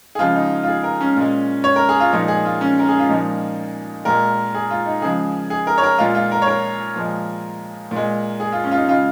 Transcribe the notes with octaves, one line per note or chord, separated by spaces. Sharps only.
G#4
C#3 F3 G#3 F4
D#4
F4
G#4
A#4
C#4
A#2 G#3
C#5
A#4
G#4
F4
A#2 F3 G#3 D#4
G#4
F4
C#4
A#4
G#4
F4
A#2 F3 G#3 D#4
A#2 G#3 A#4
G#4
F4
D#4
C#3 F3 G#3 G#4
G#4
A#4
C#5
A#4
A#2 G#3 F4
F4
A#4
C#5
A#4
A#2 F3 G#3
A#2
G#3
G#4
F4
C#4
F4
D#4
C#3 G#3 F4